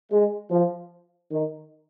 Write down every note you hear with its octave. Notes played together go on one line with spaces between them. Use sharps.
G#3
F3
D#3